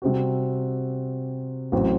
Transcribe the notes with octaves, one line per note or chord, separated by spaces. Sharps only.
C3 G3 C4 F#4
A1 A2 F#3 C4